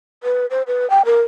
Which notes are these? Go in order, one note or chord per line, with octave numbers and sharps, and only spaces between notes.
B4
C5
B4
G5
A#4